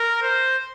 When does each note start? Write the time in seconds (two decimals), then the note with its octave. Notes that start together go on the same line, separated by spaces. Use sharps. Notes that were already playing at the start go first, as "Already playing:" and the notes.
Already playing: A#4
0.23 C5